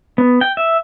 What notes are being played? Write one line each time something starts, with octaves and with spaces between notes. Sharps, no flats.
B3
G5
E5